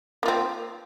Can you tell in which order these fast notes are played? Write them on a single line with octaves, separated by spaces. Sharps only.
A#3 F4 C4